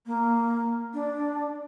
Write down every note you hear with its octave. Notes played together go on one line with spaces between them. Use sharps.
A#3
D4